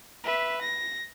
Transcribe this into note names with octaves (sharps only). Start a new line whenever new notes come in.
B4 E5
A#6